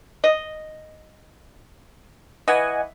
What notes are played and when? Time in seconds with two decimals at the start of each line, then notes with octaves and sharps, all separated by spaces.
0.24 D#5
2.48 E3 D#5 F#5 G#5